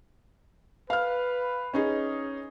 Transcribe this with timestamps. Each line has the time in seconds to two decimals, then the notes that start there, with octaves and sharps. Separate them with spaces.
0.90 B4 F5 F6
1.74 C#4 D#4 G#4